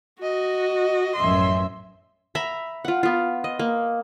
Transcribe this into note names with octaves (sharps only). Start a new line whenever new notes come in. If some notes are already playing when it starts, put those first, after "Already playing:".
F#4 D#5
A1 F#2 E5 C6
E5 A#5 B5
F4 F#5
B3 F4
D#5
A#3